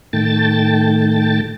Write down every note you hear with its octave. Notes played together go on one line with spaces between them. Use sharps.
A2 D#3 A3 G5 A5 A6